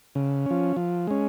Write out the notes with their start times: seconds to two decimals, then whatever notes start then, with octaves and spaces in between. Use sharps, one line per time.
0.15 C#3
0.46 F3 C#4
0.77 F3
1.07 G#3 C#4